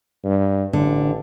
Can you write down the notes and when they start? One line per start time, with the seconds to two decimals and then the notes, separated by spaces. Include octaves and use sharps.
0.24 G2
0.73 A1 D3